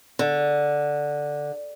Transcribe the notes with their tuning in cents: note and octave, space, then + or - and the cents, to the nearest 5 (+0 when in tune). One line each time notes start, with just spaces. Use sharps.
D3 +0